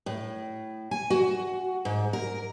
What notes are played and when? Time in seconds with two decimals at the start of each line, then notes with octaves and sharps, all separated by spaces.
0.06 A2
0.91 G#5
1.10 F#4
1.85 G#2
2.13 A#4